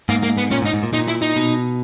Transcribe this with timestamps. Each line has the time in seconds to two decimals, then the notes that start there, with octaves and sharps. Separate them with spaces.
0.09 G#2 A#3
0.23 A#3
0.38 B3
0.51 A#2 C#4
0.62 G#2
0.65 D#4
0.73 G#2
0.83 A#2
0.93 A#2 D#4
1.08 E4
1.22 D#4
1.36 B2